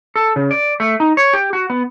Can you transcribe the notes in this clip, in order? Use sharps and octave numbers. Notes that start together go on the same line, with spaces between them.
A4
C#3
D5
A3
D#4
C#5
G4
F#4
B3